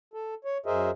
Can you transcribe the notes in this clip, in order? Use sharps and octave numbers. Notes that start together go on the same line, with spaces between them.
A4
C#5
F#2 G#4 A#4 C5 D#5 E5